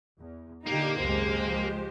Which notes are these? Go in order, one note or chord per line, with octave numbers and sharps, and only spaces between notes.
E2
A#2 D3 A#3 D#4 G4
G#1 C#2 F#2 G#3 G4 C5
C#2 F3